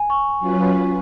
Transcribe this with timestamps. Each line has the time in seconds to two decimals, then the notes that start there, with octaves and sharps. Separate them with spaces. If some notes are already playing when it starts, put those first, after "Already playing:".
Already playing: G#5
0.10 C#6
0.39 F#3 C#4 F4 B4